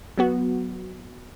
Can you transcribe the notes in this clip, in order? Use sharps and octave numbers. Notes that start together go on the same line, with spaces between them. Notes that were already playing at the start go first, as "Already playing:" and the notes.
F#3 B3 F#4